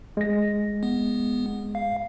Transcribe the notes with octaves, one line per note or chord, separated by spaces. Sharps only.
G#3 A#6
B3
F5